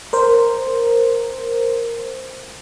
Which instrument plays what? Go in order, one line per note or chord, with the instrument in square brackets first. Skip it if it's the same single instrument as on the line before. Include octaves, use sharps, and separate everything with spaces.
[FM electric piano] A#4 C5